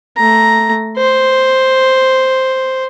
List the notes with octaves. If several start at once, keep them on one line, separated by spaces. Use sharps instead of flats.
A3 A#5
C5